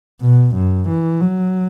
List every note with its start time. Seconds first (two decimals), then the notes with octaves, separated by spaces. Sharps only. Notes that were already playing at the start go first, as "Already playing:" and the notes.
0.22 B2
0.55 F#2
0.89 E3
1.21 F#3